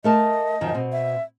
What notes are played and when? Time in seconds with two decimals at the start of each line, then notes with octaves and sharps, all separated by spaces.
0.04 A3 A#4 D#5 A5
0.61 F#2 D#3 F3
0.74 B2 C4
0.92 E5